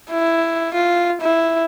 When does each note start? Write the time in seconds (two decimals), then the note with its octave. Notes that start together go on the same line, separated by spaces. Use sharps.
0.11 E4
0.74 F4
1.22 E4